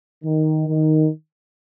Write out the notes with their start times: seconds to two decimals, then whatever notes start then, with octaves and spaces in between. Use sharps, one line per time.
0.24 D#3
0.68 D#3